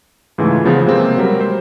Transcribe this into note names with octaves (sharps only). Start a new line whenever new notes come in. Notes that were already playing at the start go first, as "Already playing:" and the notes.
G#2 C#3 E3 A3 F4
C#3 F3 B3
C3 G#3 A#3 C4
F#3 G3 A#4
C5